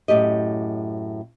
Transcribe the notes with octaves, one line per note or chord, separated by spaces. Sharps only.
F#2 A2 G4 D#5